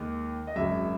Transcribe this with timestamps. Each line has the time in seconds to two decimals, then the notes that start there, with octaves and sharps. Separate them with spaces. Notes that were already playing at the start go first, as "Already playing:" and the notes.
Already playing: D#2 D#3 G#3
0.47 D#5
0.56 G#1 F#2 C#3 E5